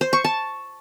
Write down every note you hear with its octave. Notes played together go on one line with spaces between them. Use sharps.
C5
C#6
A5